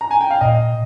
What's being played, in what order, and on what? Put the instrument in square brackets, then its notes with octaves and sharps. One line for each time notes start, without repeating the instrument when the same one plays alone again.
[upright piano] A#5
G#5
G5
F5
[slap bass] A#2 [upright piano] D#5